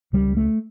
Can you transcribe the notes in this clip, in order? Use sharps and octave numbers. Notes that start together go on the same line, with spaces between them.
C#2 C#3 G3
A3